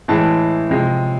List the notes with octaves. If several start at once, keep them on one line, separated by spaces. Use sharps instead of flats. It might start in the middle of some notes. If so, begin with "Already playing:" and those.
A2 E3 G#3 A5
C3 F3 G#3